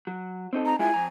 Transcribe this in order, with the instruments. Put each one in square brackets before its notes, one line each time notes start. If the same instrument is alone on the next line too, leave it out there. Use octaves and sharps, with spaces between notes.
[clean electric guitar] F#3
C4 D#4 A4
[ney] A#5
[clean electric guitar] G#3 E4 F4 [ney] G#5
[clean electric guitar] F2 A#5